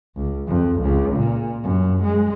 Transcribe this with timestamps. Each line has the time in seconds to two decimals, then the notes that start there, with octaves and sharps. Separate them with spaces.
0.16 C#2
0.48 F2
0.81 C#2
1.16 A#2
1.64 F#2
2.04 G#3